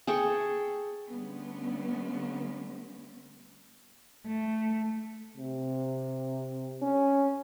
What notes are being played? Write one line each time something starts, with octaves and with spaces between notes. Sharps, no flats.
G#4 A4 G5 C#6
D3 G3 A3 B3 C#4
A3
C3
C#4